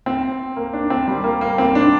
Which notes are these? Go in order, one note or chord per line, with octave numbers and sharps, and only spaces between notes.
C4
A#3
D4
C4
G3
A#3
A#3
C4
D4